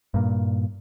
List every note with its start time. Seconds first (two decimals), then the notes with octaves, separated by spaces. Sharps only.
0.14 G2 A#2